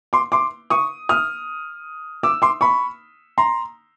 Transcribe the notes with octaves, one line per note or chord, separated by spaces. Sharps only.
C6 D6
C6 D6
C#6 D#6
D#6 F6
D6 E6
C6 D6
B5 C#6
A#5 C6